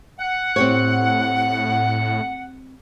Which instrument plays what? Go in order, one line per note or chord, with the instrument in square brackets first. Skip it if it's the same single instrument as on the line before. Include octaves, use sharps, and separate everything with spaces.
[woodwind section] F#5
[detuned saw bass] A2 [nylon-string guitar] C4 G4 C#5